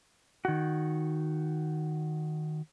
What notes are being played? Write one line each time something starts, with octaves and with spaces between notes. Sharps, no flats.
D#3 F#4